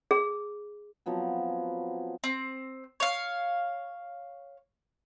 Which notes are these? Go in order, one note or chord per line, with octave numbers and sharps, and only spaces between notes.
G#4
F3 F#3 B3 C4
C4
C#5 F5